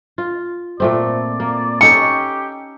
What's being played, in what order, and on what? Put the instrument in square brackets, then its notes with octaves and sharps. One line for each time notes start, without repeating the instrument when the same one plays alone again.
[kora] F4
[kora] A#2 A3 C4 [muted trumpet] D5
[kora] A#3
[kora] C#4 D#4 A4 [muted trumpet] G4 [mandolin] C#6